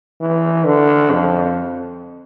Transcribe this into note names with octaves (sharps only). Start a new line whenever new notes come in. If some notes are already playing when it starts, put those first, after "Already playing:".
E3
D3
F2